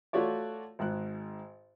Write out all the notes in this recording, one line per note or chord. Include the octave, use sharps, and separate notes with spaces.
A3 F4 F#4 C#5 D5
G#1 G#2 F#6